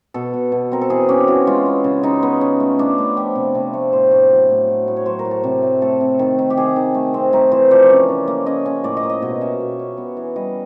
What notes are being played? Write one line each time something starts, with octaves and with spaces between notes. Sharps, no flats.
B2 A4
B2
B2
C4 A#4
A4
E3 G#4
C#4 G4
E3 F#4
G#3 F4
B3
C#3
C#3 D#4
B3
C#4
A3
A3 D4
A3
F3 G4
C3
C3
A3
A2 C5
A2
F#3
A2
F#3
A2
C#5
F#3 C5
A#4
A2
A4
C3
A3
A3 A4
C3
D#3
D#3
G4
D#3 G#4
D#3
A3
C4
A3 A#4
E3 C5
F3 D5
C#4
C#3
A#3
C#4 D#5
C#4
A2 D5
D#5
A#3
D#5
B2 D#5
C#4 E5
B2
C#4
B3
E3
G3 D#5